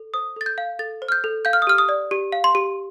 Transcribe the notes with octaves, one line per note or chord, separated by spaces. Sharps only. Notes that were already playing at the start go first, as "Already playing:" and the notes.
Already playing: A4
C5 D#6
A4 A6
G6
F5
A4 A6
C5
F6
G6
A4
F5 G6
F6
D#6
G4 F6
D#6
D5
G4
F5
C6
G4